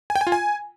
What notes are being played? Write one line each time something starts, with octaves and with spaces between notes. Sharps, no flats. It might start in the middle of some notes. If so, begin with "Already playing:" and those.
G#5
G5
G#5
F4
G#5